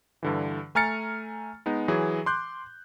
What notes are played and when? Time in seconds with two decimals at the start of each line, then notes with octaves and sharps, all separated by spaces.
0.23 G2 D3 E3
0.75 A3 G#5 A#5 F6 A6 C#7
1.66 G#3 B3 D#4
1.88 E3 F#3 G#4
2.26 C6 D6 F#6 G6